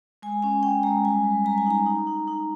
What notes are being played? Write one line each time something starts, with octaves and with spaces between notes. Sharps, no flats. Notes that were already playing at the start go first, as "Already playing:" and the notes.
G#3 G#5
C#4 G#5
C#4 G5
G#3 A#5
G3 G#5
G3
G3 A#5
G#5
D#4 A#5
D#4
D#4
D#4